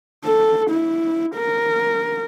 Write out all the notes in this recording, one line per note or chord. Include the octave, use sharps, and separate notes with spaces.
A4
E4
A#4